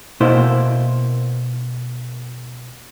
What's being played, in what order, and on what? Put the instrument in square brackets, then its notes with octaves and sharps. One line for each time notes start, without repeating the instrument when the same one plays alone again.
[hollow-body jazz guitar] B2 A#3 E4 C5